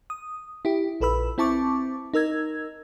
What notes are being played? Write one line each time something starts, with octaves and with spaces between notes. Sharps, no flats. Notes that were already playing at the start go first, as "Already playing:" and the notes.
D#6
E4 G4
A#1 A4 B4 B5 E6
C4 E4 A5 C#6 D6
D#4 A#4 E6 G#6